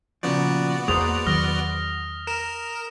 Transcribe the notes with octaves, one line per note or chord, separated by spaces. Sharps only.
A#2 C#3 F3 B3 F#4 D5
E2 A#3 G#4 C5 D#6 F7
E2 D#3 F#3 D#6 F6 A#6
A#4 E7